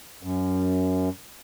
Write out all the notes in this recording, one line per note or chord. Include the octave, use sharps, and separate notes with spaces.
F#2